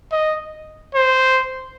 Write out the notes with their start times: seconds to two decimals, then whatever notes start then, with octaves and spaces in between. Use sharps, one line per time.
0.12 D#5
0.94 C5